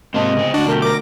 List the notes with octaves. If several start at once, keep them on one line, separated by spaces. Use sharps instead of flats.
G#2 C3 A#3 C4 D#5 A5
C#3 C5
D2 D4 F#4
B1 A3 G4 A#4
A#4 D6 A#6